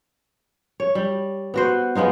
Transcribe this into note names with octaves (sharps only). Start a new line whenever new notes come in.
C#5
G3
B3 F#4 C5
G#3 B3 D#4 F4